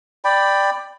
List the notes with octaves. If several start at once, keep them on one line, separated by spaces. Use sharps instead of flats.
D5 G5 B5